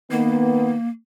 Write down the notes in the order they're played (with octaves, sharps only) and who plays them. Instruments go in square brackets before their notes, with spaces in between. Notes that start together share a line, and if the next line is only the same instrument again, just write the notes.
[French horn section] D#3 B3 [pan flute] A#3